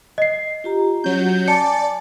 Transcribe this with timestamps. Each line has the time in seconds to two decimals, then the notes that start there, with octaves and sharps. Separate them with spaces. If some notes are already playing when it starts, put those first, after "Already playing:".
0.18 D#5 C7
0.64 F4 G4 A#5
1.04 F#3 C#4 G6
1.48 D5 G#5 A5 C#7